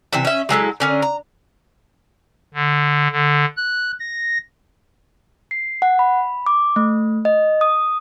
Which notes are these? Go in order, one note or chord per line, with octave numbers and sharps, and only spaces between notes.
C3 E3 E5
C#4 E5
F#3 G#3 E4 A4
D3 C#4 A#4
A#5
D3
D3
F#6
A#6
C7
F#5
B5
D6
A3
D#5
D#6